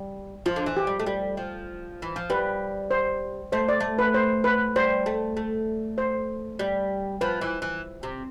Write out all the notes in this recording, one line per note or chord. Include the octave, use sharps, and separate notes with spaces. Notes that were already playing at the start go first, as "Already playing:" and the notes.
Already playing: G3
F3 F4
D3
E3
G4
G3
A3
G3
F3
E3
F3
G3 B4
C5
A3 C5
D5
A3
B4
C5
B4
G3 C5
A3
A3
C5
G3
F3 B4
E3
E3
C3